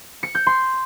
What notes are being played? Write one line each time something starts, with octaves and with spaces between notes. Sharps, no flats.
C#7
G6
C6